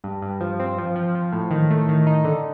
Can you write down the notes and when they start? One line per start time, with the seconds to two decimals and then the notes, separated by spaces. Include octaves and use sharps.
0.04 G2
0.22 G2
0.40 F3
0.60 C4
0.78 F3
0.96 F3
1.15 F3
1.32 A2
1.51 D#3
1.70 A3
1.89 D#3
2.07 D#4
2.25 D3